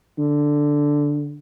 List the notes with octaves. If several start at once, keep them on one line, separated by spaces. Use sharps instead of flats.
D3